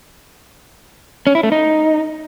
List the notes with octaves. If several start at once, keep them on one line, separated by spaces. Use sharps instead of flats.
C#4
E4
A3
D#4